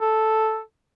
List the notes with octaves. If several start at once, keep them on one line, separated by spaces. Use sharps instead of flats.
A4